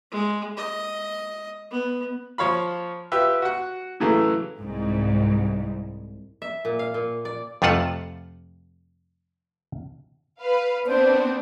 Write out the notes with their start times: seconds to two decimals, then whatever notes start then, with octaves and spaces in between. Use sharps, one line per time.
0.12 G#3
0.57 D#5
1.71 B3
2.38 F3 C#5 F5 B5
3.12 F4 G4 B4 E5
3.42 F#4 F#5
4.00 A2 C#3 E3 F#3 A3
4.60 C2 G#2
6.42 E5
6.65 A#2
6.79 F5
6.94 A#2
7.25 D5
7.62 F2 C3 A3 F4 F#5 A5
10.41 B4 F5
10.87 B3 C4 D4 C5